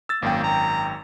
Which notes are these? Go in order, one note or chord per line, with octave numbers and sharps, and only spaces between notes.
E6 A6
G#1 F#2 A#3 G5
A#5